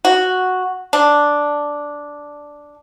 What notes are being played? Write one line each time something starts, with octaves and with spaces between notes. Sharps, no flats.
F#4
D4